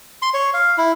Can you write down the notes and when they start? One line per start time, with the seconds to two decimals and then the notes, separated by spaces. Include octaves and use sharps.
0.22 C6
0.34 C#5
0.54 F5
0.78 E4